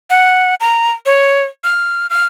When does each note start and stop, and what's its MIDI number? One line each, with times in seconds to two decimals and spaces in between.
0.10 0.55 78
0.60 0.91 82
1.06 1.44 73
1.64 2.07 89
2.10 2.26 89